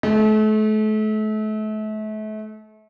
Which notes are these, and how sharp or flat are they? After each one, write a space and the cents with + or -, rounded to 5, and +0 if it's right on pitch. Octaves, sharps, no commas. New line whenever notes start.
A3 -35